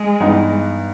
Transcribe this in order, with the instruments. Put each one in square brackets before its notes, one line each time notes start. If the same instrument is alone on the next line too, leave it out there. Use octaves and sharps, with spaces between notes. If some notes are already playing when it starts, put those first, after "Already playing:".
Already playing: [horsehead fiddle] G#3
[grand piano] G2 E3 G3 B3 D#4